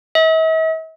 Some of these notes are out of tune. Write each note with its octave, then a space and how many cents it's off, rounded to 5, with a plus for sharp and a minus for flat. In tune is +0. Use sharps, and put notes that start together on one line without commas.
E5 -45